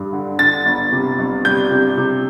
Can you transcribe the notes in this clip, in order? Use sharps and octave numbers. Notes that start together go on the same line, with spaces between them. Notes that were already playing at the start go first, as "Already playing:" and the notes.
Already playing: G2
D3
D3 A6
G1
C3
G1
G3 G6
C3
C3